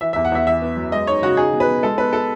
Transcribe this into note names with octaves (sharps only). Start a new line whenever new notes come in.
E3 E5
E2 E5
F#5
E2 E5
E3 E5
B3
F#2
G#3 D#5
D#4 C#5
C#3 F#4
D#4 G#4
B2
B4
B2
G#3 A4
B3 B4
A4